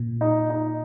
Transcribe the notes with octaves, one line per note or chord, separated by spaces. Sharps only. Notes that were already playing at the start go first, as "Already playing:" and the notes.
Already playing: A#2
D#4
D#4